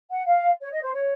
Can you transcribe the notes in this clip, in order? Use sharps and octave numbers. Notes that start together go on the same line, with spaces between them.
F#5
F5
C#5
D#5
C5
C#5